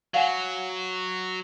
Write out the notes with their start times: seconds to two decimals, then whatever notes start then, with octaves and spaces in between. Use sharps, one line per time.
0.14 F#3 F5 F#5 G#5